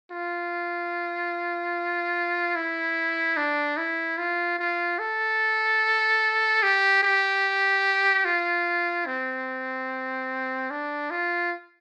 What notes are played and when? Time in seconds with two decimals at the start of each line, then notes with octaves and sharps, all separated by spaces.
0.11 F4
2.55 E4
3.37 D4
3.77 E4
4.18 F4
4.59 F4
4.99 A4
6.63 G4
7.02 G4
8.25 F4
9.06 C4
10.70 D4
11.11 F4